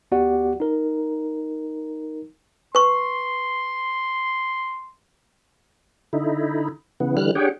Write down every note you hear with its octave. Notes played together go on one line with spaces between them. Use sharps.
D2 B3 F#4 G4 D5 F#5
D#4 A#4
B4 C6 C#6
D3 D#4 E4
C#3 E3 B3
D3 E3 G3 F6 F#6
D4 G4 G#4 C#5 F#5 G5